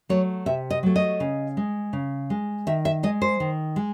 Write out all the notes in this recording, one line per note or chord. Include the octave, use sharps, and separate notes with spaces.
F#3 A3 C#5
C3 E5
D#5
F#3 A3
D#5
C#3
G#3
C#3
G#3
D#3 E5
E5
G#3 D#5
C5
D#3
G#3